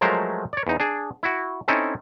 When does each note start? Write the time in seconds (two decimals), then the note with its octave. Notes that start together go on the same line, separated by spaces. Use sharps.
0.01 F3 F#3 G#3 A3 A#4 C5
0.53 C#5 D5
0.67 E2 D#4
0.80 D4 G#4
1.23 E4 F#4
1.68 C4 C#4 D#4 E4 A4